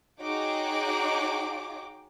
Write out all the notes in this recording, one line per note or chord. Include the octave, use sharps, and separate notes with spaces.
D#4 F#4 G#4 C#5 G5 D6